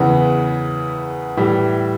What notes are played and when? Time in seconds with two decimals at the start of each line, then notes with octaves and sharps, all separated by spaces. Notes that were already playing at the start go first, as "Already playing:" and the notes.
Already playing: E2 C#3 E3 B3
1.37 A2 E3 G3